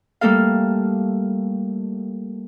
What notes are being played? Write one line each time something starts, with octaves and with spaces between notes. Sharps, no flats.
G3 A3 A#3 A4 F5